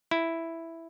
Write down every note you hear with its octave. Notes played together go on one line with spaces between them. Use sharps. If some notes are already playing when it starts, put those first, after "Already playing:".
E4